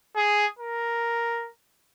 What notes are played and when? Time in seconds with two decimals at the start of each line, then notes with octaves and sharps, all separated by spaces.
0.16 G#4
0.59 A#4